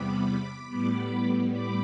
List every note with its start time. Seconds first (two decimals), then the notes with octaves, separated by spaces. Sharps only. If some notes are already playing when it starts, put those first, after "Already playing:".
Already playing: E2 C3 G3 B3 B5 D6
0.68 A2 G3 B3
1.52 B5 D6